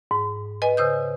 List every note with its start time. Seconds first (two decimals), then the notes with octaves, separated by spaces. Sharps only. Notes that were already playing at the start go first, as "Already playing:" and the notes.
0.11 G#2
0.62 B4 D#5 G#5
0.77 C#3 C5 D#6 G6